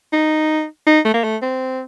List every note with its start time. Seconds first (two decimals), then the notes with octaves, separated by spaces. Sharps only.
0.13 D#4
0.86 D#4
1.05 A3
1.14 A#3
1.24 A3
1.42 C4